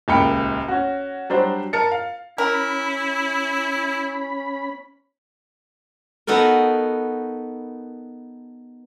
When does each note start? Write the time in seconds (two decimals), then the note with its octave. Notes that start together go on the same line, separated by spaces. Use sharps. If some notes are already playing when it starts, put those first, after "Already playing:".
0.08 D#1 C#2 A#3 G5 B5 C#7
0.68 C#4 F#4
1.30 F#3 G3 D4 C5
1.73 A#4 A5 A6 C#7
1.92 F5
2.38 C#4 E4 A#4 B5
6.27 B3 D#4 F#4 A4 A#4